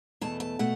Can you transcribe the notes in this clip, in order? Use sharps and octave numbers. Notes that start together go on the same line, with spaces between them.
E2 B2 A3 A5
A5
B2 A3 F#5